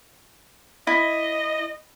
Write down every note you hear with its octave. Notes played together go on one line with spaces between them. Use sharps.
E4 D#5